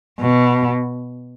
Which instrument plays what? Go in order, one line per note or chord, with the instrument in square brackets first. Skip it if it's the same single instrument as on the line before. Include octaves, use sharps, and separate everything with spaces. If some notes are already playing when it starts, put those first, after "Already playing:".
[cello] B2